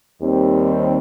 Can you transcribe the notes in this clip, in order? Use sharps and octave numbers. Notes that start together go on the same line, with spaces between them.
D#2 D#3 G3 C4